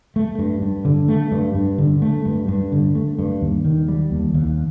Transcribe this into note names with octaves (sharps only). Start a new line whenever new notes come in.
A3
G2
G2
D3
A3
G2
G2
D3
A3
G2
G2
D3
A3
G2
D#2
D#3
G3
D#2
D#2